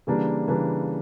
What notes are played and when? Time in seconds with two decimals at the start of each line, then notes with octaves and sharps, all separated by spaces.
0.07 C#3 E3 G3 A#3 D4
0.48 C#3 E3 G3 A#3 D4